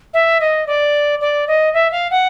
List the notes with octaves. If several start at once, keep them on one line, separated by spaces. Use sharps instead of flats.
E5
D#5
D5
D5
D#5
E5
F5
F#5